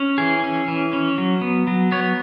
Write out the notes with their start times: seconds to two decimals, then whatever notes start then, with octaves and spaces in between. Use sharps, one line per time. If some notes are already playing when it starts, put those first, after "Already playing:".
Already playing: C#4
0.18 E3 G#4
0.44 C#4
0.68 E3
0.93 C#4
1.18 F#3
1.41 B3
1.67 F#3
1.92 B3 C#5